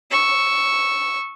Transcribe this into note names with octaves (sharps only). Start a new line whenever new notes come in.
C#6 E6